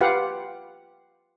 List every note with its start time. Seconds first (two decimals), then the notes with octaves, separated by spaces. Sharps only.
0.01 F4 G4 B4 F5 F#5